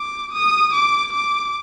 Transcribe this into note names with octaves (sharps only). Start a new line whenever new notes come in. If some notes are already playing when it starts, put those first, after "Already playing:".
Already playing: D6
D#6
D6
D6